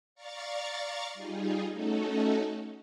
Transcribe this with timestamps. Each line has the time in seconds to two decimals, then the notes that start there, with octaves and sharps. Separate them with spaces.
0.15 D5 F5 A#5 C#6 A6
1.14 G3 D#4 F4 G#4
1.70 A3 C#4 D#4 F#4 A4